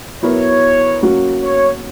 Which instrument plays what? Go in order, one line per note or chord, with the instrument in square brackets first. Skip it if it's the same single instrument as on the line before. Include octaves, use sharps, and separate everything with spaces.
[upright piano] F#3 B3 E4 A#4 [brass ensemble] C#5
[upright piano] F#3 A#3 C#4 F#4
[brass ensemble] C#5